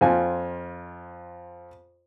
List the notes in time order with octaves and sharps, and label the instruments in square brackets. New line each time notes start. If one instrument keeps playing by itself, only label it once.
[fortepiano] F2 F4 G#5